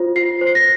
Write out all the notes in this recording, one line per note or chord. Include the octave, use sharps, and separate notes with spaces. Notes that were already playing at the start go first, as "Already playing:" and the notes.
Already playing: F4 C5
F4 C7
C5
C7
A#6